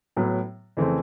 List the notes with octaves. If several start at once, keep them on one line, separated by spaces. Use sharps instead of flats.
A2 F#3 B3
F2 C#3 E3 A3 C4